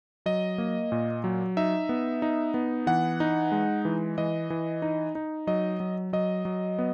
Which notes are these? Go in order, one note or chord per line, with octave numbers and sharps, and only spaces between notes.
F#3 D#5
A#3
A#2
F#3
D#4 E5
B3
D#4
B3
E3 F#5
D#4
G#3
E3
E3 D#5
E3
D#4
D#4
F#3 D#5
F#3
F#3 D#5
F#3
B3